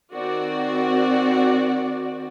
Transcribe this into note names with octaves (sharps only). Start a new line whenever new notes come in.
D#3 C4 F#4 D5